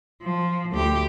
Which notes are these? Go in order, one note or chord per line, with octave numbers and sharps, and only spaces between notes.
F3
D2 G4